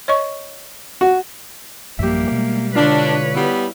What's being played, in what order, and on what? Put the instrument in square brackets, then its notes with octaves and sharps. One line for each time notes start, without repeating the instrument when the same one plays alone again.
[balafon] C#5 D#5 C#6
[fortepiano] F#4
[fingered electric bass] A1 F#2 F3 [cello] G3 A#3 [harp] G4 E5
[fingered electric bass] B2 G#3
[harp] D3 E4 F4 [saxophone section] D4 [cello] B4 C#5
[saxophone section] G3 B3 [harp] E4